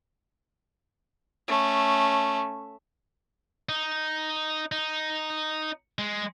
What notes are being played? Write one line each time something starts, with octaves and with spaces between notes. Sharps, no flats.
A3 C#4
D#4
D#4
G#3